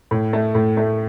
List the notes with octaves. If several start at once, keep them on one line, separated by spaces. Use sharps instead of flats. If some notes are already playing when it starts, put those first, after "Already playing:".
A2
A3
A2
A3